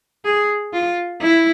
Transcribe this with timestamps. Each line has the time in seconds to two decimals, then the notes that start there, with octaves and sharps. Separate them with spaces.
0.25 G#4
0.73 F4
1.22 E4